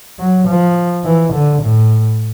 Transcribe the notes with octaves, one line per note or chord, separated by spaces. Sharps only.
F#3
F3
E3
D3
A2